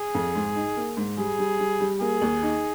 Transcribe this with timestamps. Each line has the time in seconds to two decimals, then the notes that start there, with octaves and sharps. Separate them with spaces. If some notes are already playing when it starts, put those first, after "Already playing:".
Already playing: G#4
0.15 F2
0.35 G#2
0.56 D#4
0.77 A#3
0.97 G#2
1.18 G3 G#4
1.38 G3
1.59 G3
1.80 G3
2.00 A#3 G#4
2.21 D#2
2.43 D#4